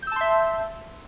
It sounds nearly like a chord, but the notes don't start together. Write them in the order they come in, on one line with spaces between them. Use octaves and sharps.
G6 E6 A5 C6 E5